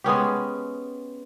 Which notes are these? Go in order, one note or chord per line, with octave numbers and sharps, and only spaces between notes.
G#3 B3 C#4 G4